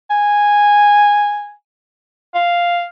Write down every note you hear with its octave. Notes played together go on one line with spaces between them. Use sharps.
G#5
F5